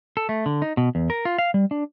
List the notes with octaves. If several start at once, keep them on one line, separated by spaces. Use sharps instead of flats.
A4
A3
D3
D#4
B2
E2
A#4
F4
F5
G3
D4